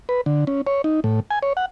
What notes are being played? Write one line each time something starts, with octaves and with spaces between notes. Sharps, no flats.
B4
D3
C#4
C#5
D#4
A2
G#5
C#5
F#5